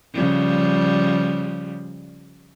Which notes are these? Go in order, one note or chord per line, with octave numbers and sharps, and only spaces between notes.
C#3 F3 G3